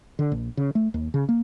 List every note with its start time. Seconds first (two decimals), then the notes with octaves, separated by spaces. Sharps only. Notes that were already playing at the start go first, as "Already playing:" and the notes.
0.19 D3
0.32 A#1
0.57 C#3
0.75 A3
0.94 D#2
1.14 C#3
1.29 A#3